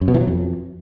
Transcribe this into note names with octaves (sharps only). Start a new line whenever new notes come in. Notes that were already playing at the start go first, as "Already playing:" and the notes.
F#2
B2
E3
F#3
F2